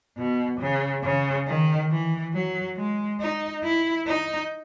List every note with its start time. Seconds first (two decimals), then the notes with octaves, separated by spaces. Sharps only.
0.17 B2
0.60 C#3
1.03 C#3
1.47 D#3
1.90 E3
2.34 F#3
2.77 G#3
3.21 D#4
3.63 E4
4.06 D#4